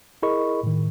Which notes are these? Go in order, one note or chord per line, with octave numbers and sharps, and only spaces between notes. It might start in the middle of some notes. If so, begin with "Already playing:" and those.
E4 G#4 A#4 D#5 B5 C#6
A2 D#3